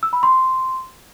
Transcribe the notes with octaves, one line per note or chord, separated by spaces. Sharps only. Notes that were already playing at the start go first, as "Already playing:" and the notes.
E6
B5
C6